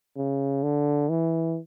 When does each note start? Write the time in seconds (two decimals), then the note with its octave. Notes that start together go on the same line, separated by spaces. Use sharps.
0.17 C#3
0.63 D3
1.09 E3